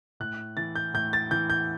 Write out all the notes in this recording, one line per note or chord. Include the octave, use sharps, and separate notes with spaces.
A2 F#6
E3 A6
G6
A2 G6
A6
E3 G6
G6